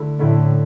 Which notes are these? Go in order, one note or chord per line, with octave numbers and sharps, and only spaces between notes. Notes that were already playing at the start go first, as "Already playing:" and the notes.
Already playing: D3 A3 E4
A2 D3 A3 E4